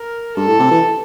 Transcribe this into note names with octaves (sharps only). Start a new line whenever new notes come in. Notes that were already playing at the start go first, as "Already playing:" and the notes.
Already playing: A#4
G2 A4
A2
C3
E3